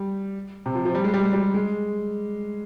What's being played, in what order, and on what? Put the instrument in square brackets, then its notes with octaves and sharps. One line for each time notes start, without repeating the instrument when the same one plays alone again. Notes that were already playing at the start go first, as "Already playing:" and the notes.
Already playing: [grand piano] G3
C3
F3
F3
G3
G#3
G3
G#3
G3
G#3